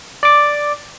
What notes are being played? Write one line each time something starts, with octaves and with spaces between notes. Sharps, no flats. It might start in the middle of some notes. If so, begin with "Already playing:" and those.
D5 D6